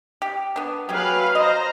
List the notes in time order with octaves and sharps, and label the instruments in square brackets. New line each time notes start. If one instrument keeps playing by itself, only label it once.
[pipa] G4
B3 D4
[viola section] F#3 B4 F5 [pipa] C#4 G4 G#4
[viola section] C5 A#5 [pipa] D#5